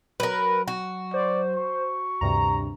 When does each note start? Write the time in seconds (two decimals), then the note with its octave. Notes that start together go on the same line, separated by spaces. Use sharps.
0.20 F#3 A#4 B4
0.68 F#4
1.14 C5 D5
1.55 C#6
2.21 D2 G2 C3 A#5